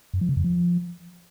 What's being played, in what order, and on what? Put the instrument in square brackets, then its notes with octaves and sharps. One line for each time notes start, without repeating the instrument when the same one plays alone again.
[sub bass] F#2
F3
C#3
F2
F3